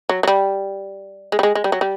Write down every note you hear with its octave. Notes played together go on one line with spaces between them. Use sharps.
F#3
F#3
G3
G#3
G3
G#3
G#3
G3
F#3
G3